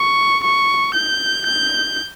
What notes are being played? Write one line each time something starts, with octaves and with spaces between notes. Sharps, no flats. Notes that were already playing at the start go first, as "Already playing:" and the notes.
Already playing: C#6
C#6
G6
G6